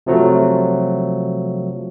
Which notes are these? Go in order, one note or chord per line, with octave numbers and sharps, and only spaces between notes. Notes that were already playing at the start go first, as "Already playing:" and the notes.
C3 F3 F#3 A3